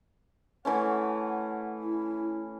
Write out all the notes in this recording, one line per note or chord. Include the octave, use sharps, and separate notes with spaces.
E3 A3 C#4 F#5
E4